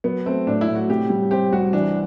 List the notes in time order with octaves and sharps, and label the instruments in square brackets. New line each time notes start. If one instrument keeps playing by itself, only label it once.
[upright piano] F#3 [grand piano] B3
[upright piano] A3 [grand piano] C4
[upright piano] A2 [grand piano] D4
[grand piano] E4
[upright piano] A2
[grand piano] F#4
[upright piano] C3 [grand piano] G4
[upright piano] G3
[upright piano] C4 [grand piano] G4
[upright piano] C2 [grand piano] F#4
[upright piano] E3 [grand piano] D4